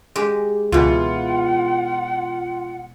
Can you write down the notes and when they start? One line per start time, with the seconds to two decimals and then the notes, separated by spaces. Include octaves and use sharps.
0.16 G#3 G4
0.72 C#2 B2 E3 F4 F#5